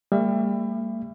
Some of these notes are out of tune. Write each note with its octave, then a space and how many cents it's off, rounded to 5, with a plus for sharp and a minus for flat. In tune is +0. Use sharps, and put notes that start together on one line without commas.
G3 +35 A#3 -40 E5 +30